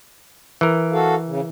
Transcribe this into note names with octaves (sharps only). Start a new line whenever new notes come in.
E3 A#4
F#4 A4 F5
C#3